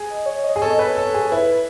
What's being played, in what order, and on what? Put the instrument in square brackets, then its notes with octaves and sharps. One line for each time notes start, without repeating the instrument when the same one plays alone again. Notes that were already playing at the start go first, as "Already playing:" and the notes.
Already playing: [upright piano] G#4
[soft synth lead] D#5
C#5
D#5
[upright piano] G#4
[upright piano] A4 [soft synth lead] C#5
[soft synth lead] D#5
[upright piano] B4 [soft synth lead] C#5
[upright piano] A4
G#4
[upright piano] E4 [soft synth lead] B4